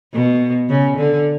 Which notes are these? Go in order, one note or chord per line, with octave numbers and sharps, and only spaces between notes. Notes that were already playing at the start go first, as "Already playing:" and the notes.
B2
C#3
D3